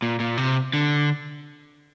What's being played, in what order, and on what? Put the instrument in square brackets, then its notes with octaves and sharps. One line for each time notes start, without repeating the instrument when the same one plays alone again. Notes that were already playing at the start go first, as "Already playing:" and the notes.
[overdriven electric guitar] A#2
A#2
C3
D3